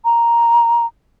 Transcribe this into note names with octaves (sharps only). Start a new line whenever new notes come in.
A#5